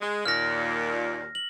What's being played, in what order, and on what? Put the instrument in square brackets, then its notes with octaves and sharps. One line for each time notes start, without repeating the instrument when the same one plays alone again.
[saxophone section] G#3
[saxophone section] D#2 A#2 [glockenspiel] F6 A#6
[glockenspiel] F#7